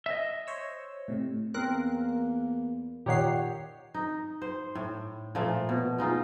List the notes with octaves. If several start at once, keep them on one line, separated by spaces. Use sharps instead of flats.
D#5 E5
C5 C#5 E6
A2 C3
E2 A#3 C4 A#4 F#6
A#2 D#3 G4 C#5 F#5 C7
D#4
C5
A2
A#2 F3 A3
B2
G#3 D#4 F4